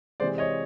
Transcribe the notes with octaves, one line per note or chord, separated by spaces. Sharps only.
C3 E3 G#3 C5 D5
C#5 D#5